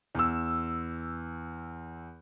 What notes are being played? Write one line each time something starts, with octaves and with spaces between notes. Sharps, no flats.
E2 E6